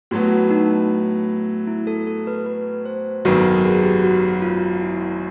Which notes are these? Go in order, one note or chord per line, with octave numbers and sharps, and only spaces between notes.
A2 F#3 B3 F#4
D#4
E4
A4
A4
B4
B4
C5
G#1 F#2 D#3 F#3 B3 B4
A4
A#4
G#4
G4
F#4
F4
E4